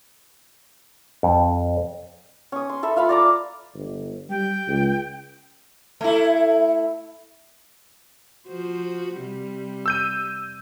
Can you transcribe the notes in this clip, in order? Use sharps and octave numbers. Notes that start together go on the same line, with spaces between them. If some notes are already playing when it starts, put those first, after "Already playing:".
F2
C#4 D#6
C6
A4 E5 B5
F4 F5 B5
D5 A#5 D6
G1
G3 G5
C#2
A3 E4
F3 F#4 C5
C3 G3
E6 G6 D#7